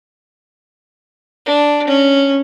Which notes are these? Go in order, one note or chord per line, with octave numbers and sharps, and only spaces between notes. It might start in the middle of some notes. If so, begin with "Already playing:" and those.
D4
C#4